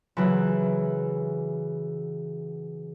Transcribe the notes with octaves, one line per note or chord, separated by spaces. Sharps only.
C#3 E3 F#3